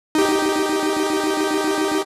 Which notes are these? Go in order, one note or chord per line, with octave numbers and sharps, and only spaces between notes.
D#4 G4